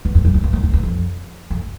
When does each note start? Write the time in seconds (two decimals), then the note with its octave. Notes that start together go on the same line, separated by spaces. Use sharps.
0.05 E2
0.15 F2
0.25 F#2
0.34 F2
0.44 E2
0.53 F#2
0.63 F2
0.73 E2
0.83 F2
1.50 F2